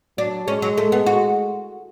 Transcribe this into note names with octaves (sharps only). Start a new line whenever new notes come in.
F#3 D4
G#3 C#4
F#3
A3
B3
F#4